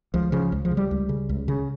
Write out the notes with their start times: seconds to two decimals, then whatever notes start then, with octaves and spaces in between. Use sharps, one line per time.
0.14 C#2 F3
0.32 C#3 F3
0.52 C#2
0.65 F3
0.71 C#3
0.77 G3
0.91 C#2
1.09 C#3
1.29 C#2
1.48 C#3